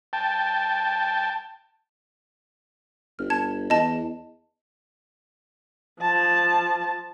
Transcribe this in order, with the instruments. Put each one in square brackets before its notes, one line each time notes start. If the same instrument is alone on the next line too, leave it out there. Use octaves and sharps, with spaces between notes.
[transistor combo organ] G5 A5
[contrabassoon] G1 [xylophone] F6
[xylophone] A5 G#6
[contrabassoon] E2 [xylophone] D#5 A5
[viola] F3 A5